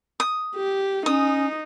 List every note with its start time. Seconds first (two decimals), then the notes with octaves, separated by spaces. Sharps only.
0.20 D#6
0.55 G4
1.06 C#4 D#4 D#6